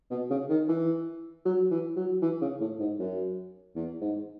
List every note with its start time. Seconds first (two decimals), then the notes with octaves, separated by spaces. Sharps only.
0.11 B2
0.30 C#3
0.50 D#3
0.68 E3
1.45 F#3
1.71 E3
1.96 F#3
2.22 E3
2.42 C#3
2.60 A2
2.80 G#2
2.99 F#2
3.76 E2
4.01 G#2